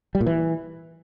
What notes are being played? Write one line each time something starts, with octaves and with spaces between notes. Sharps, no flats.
G3
A#2
E3